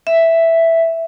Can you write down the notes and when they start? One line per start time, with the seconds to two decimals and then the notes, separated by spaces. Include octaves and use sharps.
0.07 E5